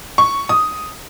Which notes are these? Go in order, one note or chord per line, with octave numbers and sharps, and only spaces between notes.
C#6
D#6